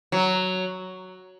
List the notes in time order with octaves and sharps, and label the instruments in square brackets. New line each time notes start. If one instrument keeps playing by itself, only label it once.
[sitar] F#3